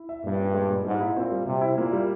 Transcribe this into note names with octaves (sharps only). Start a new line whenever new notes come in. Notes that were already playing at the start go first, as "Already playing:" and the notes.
Already playing: E4
E5
G2 A#2
C#4
G#3
A#2
G#2 G3
E4
A#2 C4
G3
C3 G3
E4
A#2 A#3
G3